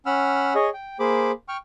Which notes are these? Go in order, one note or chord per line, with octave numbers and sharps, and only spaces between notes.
C#4 F#5 B5 E6 F6
G#4 C#5 D#5
G5
A#3 G#4 C5 B5 D6
G5 C#6 F6